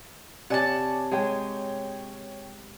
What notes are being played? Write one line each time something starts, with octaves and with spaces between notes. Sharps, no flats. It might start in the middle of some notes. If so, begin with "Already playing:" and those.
C3 C#5 D5 F#5 G#5 A5
G#3 G#4 C#5 G5